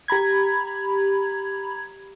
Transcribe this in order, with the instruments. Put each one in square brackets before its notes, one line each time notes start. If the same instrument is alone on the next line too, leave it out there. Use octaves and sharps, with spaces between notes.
[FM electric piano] G4 A#5 B5 G#6